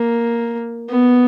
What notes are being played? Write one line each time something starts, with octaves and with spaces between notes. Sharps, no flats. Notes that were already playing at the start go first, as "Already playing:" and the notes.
Already playing: A#3
B3